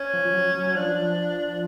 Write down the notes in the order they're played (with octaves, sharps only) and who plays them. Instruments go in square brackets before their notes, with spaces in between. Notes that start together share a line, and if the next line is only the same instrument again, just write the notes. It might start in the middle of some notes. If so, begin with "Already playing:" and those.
Already playing: [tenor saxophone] C#4
[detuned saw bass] F3
F3
F#3
F#3
[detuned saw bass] F3 [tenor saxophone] D4